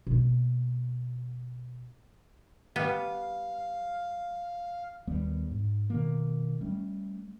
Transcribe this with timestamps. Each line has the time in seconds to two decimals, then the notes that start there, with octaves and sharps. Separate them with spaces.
0.07 B2 A#3
2.76 G3 B3 F5
5.07 D#2 G3 B3
5.51 G#2
5.90 B2 D#3 A#3
6.61 G3 A3 C#4